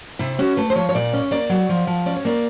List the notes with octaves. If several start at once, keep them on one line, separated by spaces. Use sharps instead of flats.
C3 E4
C#4 F#4
A3 B4
C5
F3 C#5
C#5
A#2 D5
C#4
A#3 D5
F#3
F3
F3
C#4 D5
C#5
A#3 D5